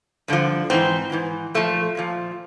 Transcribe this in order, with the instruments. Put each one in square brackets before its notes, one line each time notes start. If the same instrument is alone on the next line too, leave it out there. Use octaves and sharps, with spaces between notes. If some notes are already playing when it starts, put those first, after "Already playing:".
[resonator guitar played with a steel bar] G2 D3 F3
G#2 E3 C4
G#2 E3
A#2 F3 A3
A#2 F3